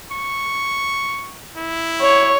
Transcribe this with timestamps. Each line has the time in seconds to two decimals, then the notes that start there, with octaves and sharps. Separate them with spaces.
0.12 C#6
1.57 E4
2.02 C#5